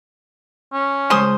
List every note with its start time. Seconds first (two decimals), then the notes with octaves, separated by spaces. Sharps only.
0.73 C#4
1.10 C#3 G#3 C5 G#5 C6 D#6